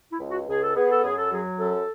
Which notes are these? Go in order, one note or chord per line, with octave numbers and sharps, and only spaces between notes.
E4
C#2
F#4
C#2 G#4
A4
B3 G#4
A4
F#2 G#4
A4
F#3 G#4
F#2 A4